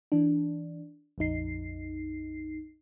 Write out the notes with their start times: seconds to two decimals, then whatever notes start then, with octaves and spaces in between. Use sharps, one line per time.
0.12 E3 D4
1.18 A#1 F2 D#4 C7